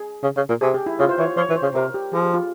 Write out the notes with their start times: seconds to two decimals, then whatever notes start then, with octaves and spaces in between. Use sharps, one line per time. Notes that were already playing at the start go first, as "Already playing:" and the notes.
Already playing: G#4
0.23 C#3
0.37 C#3
0.49 A#2
0.61 C3 G#4
0.74 G4
0.86 E4
0.99 C#3 F4
1.09 C5
1.18 E3 C#5
1.37 F3 C#5
1.49 E3
1.56 C5
1.62 C#3
1.74 C3 A#4
1.94 G4
2.13 F3 G#4
2.23 G4
2.34 F4